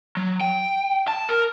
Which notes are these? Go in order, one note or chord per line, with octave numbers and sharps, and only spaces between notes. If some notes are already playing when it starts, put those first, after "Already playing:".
F#3
G5
A5
A#4